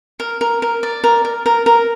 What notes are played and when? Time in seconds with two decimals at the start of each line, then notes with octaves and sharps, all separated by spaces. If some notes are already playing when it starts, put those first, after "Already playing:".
0.20 A#4
0.41 A#4
0.62 A#4
0.83 D5
1.04 A#4
1.25 A#4
1.46 A#4
1.66 A#4